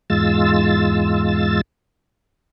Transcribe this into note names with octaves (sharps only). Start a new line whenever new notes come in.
E2 G#2 G#3 F4 E6 A6